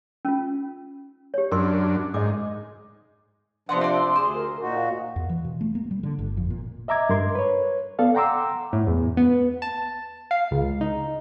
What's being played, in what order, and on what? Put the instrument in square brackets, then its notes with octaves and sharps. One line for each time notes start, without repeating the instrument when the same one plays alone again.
[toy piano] C#4 F4
G4 C#5
[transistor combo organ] F#2 D4 [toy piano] A#4 C6
[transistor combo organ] G#2 [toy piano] D#5 D6
[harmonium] C3 F3 D4 [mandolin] B3 C4 F#5 [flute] C6
[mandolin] C4 D5
[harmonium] D2 G#4 [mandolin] C5
[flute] A#4
[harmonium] A#2 F#4 [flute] D#4
[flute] F5
[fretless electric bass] E2
E3
B2
A3
A#3
G3
D3
G1
F2
A#2
[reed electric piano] D#5 E5 A#5 D6 G#6
G2 A#4 C6 G#6
B4 C#5
B3 A4 D5 F5
F#5 G5 A#5 C6 D6 E6
[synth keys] A2
E2
B3
A5
F5
C#2
D#4